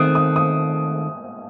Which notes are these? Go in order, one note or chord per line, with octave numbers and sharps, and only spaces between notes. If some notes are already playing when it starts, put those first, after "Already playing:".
Already playing: D#3 A3 C4 D#6 F#6
D#6
D#6